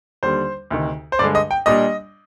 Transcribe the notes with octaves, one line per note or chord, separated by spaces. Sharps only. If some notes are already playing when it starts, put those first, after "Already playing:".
D#2 D3 G3 C5
D2 C3 D#3
C5
G2 D3 G#3 D5
D#5
G5
A#2 G3 D4 D#5